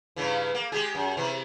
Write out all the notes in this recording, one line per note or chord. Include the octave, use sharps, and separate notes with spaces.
G2 C#3 E3
A#3
G#3 G4 G#4
F#2
C3 E3